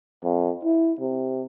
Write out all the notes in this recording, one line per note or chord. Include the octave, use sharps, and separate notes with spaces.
F2
E4
C3